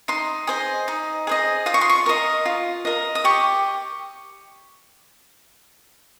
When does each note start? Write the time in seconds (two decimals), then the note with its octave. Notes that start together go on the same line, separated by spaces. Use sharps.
0.08 D#4 C6
0.47 G#4 C5 D#5
0.88 D#4
1.27 G#4 C5 D#5
1.66 F4 D#6
1.74 C#6
1.81 C6
1.89 C#6
2.06 A#4 D#5
2.46 F4
2.85 A#4 D#5
3.15 D#6
3.24 G4 C#6